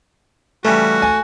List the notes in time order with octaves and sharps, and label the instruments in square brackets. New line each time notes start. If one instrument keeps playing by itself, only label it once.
[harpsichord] C#3 E3 G3 [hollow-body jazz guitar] A3 [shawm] F#4
[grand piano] G#5